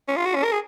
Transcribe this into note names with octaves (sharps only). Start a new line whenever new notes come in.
C#4
F4
F#4
C#4
A#4
G#4